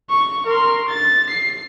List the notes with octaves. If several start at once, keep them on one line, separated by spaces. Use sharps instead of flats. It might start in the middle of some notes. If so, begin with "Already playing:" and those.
C#6
A#4 C6
A6
C7